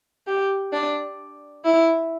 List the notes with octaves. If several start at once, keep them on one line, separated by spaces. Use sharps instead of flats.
G4
D4
E4